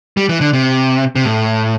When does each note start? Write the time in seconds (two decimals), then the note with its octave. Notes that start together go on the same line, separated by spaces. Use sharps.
0.17 G3
0.29 E3
0.41 D3
0.53 C3
1.16 C3
1.25 A2